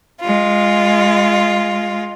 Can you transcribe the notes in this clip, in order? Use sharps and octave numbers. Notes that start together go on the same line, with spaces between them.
G#3 F4